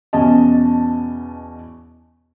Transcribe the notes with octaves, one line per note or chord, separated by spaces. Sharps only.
E2 B2 C#4 D#5 A5